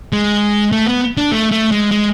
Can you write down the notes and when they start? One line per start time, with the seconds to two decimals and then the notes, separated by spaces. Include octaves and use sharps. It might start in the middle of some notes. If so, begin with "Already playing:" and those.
0.13 G#3
0.72 A3
0.86 B3
1.17 D4
1.32 A3
1.51 A3
1.71 G#3
1.91 G#3